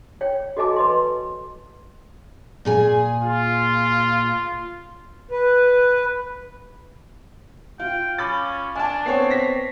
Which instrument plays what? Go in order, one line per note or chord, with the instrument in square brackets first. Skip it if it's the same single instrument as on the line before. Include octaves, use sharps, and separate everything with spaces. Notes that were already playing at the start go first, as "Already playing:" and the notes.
[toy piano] C#5 G5
F#4 A4 D#5 G#5 A5 D6
B4 D#5 C6
[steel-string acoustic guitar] A#2 G#4 G#5
[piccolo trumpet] F4
[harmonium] B4
[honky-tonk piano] F4 [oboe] G5
[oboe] C#4 [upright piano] B5 D6 A6
[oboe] D4 [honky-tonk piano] G#5 A5
[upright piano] B3 C4 C#5 [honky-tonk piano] C7
[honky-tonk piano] A#6 B6